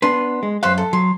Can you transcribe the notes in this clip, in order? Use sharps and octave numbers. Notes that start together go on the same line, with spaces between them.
B3 D4 B4 C6
G#3
F#2 B4 C5 F5 C6
A4
F#3 C6